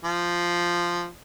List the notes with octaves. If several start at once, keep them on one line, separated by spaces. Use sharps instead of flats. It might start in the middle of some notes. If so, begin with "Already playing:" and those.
F3